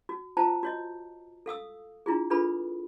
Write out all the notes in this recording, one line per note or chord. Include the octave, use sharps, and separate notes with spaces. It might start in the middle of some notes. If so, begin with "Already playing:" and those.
F#4
F4 C5 G5 A5 A#5
F#4 C#5 D#5
A4 F5 D#6 E6
D4 E4 F4 G#4
D4 F4 G#4 A4 B4 B5